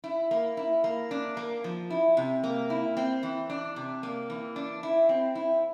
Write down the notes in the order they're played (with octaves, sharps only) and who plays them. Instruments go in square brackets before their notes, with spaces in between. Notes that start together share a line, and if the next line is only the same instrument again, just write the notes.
[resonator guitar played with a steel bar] E4
A#3
E4
A#3
D4
A#3
F3
E4
C3
A#3
E4
C4
E3
D4
C3
A#3
E3
D4
E4
C4
E4